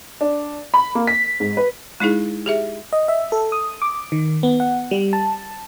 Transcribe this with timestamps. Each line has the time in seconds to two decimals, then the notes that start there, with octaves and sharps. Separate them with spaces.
0.21 D4
0.74 B5
0.95 A#3
1.07 B6
1.40 G#2
1.57 B4
2.00 G#3 D#4 E4 G#4
2.46 G4 G#4 E5
2.93 D#5
3.08 E5
3.32 A4
3.52 D#6
3.82 D6
4.12 D#3
4.43 B3
4.60 F#5
4.91 G3
5.13 A5